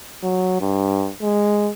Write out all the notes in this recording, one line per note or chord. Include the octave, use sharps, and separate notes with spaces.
F#3
G2
G#3